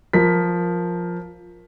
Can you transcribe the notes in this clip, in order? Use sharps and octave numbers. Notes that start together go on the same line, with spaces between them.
F3 A#4 B6